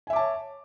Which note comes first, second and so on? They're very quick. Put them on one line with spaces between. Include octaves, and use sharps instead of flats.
G#5 E5 D6 A5 C#5